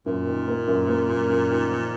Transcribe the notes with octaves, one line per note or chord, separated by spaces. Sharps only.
F#2 A#2
D#3
A#3
F#2
A#3
F#2
F#2
D#3
F3